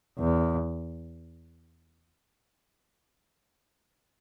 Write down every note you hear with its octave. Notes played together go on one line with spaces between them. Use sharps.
E2